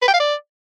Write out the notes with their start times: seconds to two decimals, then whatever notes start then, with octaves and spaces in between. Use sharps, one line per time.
0.02 B4
0.08 G5
0.14 F5
0.20 D5